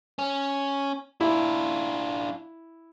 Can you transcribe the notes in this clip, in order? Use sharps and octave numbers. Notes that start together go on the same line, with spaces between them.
C#4
D4 E4 F4